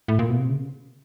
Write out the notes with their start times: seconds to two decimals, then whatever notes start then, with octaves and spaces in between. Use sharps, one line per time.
0.08 A2
0.19 A#2
0.29 B2
0.39 C3
0.49 C#3